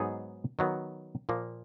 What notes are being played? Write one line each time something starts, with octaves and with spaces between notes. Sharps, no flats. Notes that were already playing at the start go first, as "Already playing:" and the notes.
Already playing: G#2 F#3 B3 D#4 G#4
D#3 F#3 B3
A#2 F3 A#3